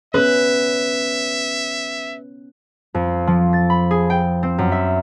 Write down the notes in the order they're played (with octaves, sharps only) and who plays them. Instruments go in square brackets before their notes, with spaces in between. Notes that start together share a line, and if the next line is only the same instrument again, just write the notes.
[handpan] B3 C#4 [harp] B4 [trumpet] E5
[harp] F2
F3
A6
B5
G#4
G5
C4
F#2
E5